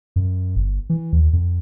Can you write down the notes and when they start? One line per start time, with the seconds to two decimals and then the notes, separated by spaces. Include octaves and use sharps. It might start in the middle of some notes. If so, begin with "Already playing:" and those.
0.16 F#2
0.56 G1
0.90 E3
1.13 D#2
1.33 F2